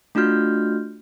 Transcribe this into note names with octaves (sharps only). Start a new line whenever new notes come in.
A3 D4 F4 F#4 F6 G6